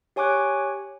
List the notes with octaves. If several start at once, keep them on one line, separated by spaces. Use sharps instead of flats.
G4 C#5 G#5 C#6 D6 F#6